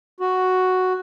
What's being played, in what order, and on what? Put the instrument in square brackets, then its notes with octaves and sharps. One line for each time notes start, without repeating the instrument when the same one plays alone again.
[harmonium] F#4